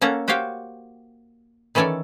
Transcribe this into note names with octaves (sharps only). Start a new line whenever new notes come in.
A#3 C#4 A4 F#5 A#5
F#4 G4 C5 C#5 F5 G5
D#3 E3 C#4 A4 C#5 D5